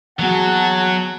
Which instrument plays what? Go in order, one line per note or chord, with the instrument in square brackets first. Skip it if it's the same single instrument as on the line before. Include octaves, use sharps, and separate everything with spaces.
[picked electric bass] E3 A#3 B3 [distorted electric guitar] F#3 [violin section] F#4 G#4 A5 [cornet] F#5